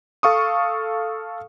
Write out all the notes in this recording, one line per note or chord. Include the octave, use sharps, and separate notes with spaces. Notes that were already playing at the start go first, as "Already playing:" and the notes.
A4 F5 C#6 D#6